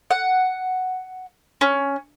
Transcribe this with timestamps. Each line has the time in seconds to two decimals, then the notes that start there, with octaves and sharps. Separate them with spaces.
0.11 F#5
1.61 C#4